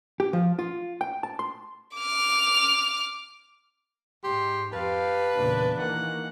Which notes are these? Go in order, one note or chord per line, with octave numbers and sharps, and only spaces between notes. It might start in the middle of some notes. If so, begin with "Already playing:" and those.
G4
F3
F4
G5
A5
C6
D6 F6
G#2 G4 C6
F2 G4 B4 F5 A5
E2 A#2 C#3 D4
D#3 E3 A#3 F#5